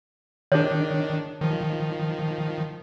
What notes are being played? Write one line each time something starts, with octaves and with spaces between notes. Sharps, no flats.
D#3 D4 G#4 C#5
D#3 F3